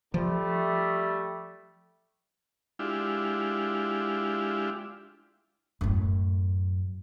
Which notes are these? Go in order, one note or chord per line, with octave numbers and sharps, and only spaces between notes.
F3 G3 A3
G#3 D4 E4 F4 G4
F#2 A2